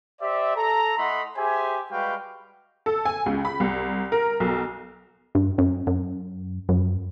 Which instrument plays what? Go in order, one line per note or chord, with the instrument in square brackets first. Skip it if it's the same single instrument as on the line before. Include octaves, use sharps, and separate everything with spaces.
[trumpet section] G4 C5 D5 E5
A4 A#5
A3 E4 D#5 F#5 B5 C6
G4 G#4 C5 E5 G#5
G3 G#3 F#4 B4 F5 G5
[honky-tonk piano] A4
G#5
C#2
B5
C2
A#4
B1
[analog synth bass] G2
F#2
F#2
F#2